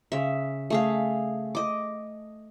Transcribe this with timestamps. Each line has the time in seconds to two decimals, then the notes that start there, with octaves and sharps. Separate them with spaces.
0.12 C#3 E5
0.70 A3 G#4 F5
1.55 D#5 D6